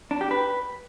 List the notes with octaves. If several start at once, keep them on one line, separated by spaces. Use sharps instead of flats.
D4
G4
B4